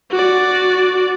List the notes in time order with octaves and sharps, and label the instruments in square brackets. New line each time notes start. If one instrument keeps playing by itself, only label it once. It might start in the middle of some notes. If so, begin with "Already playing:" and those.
[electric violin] F#4 D5